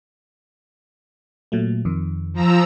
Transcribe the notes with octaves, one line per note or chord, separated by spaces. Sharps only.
A#2 F#3 A3
F2 D#3
F3 A#5 E6